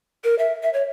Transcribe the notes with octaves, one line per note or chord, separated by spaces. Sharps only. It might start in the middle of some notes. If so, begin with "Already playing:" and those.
A#4
E5
E5
C#5